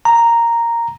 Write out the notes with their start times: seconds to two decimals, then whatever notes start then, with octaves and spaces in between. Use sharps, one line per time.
0.05 A#5